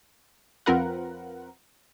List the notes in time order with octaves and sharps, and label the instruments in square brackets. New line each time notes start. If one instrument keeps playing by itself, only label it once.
[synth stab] F2 C4 F4 A#4 B4 F#5